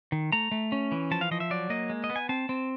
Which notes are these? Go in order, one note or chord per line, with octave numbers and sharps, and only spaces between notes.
D#3
A3 A#5
A3
C#4
E3
F3 A5
F5
F3 D#5
E5
F#3 D5
A#3 D#5
G#3
D#5
B3
G#5
C4 A5
C4